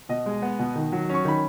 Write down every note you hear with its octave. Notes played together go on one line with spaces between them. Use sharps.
B2 D#5
G#3
B3
B2
D#3
F#3
C#4 C#6
D#3 B5